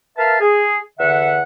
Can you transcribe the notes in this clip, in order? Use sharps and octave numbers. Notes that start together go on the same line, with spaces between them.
A#4 B4 E5 F5 A5
G#4
E2 D3 E5 F#5